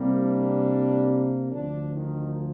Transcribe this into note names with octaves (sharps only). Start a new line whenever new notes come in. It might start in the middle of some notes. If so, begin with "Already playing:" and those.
Already playing: C2 C3 G3 A#3
D4
D2 D3 F3 D4
D#3 D#4